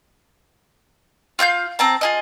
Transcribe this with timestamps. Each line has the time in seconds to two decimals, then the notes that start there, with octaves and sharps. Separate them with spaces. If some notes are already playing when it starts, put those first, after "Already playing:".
1.39 F4 F5 F#6 G6
1.79 C4 A5 A#5
2.01 F4 G#4 D#5